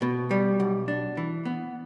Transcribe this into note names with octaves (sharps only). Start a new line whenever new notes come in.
B2
G3
B1
D4
E3
B3